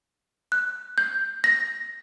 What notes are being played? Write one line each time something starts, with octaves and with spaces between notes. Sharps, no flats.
F#6
G6
A#6